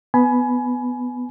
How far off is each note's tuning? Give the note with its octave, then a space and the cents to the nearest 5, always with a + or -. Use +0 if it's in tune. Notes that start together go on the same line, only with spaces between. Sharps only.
B3 +10 G#5 +25 B5 +0